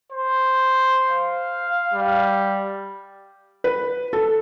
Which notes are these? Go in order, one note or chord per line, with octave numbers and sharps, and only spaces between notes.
C5
F5
G3
B4
A4